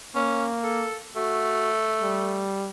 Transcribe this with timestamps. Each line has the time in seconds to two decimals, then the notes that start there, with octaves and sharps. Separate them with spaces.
0.15 A#3 C#4
0.64 A4
1.16 A3 F#4
2.02 G3